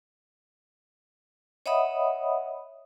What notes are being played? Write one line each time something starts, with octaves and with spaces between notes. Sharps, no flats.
C#5 D#5 E5 F#5 B5 D#6